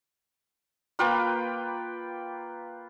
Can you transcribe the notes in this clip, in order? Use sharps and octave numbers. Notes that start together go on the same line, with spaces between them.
A#3 F4 B4 G5